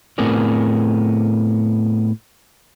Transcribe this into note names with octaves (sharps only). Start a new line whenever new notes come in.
A2 B3 C4 G#4 A#4 D5